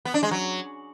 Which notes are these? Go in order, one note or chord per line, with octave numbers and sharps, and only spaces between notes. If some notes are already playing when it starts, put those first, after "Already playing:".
B3
D4
G#3
F#3